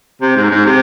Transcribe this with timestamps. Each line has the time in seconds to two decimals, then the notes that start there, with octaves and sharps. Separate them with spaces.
0.21 C3
0.36 G#2
0.50 G#2
0.65 C3